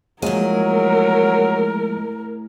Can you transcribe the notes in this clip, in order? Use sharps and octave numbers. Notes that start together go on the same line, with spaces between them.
A2 F3 F#3 G#3 A#3 G#4 A#4